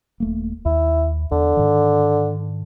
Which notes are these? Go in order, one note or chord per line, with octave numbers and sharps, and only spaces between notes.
D#1 A3 A#3
D#2 E4
E2 D3
G#2 D#3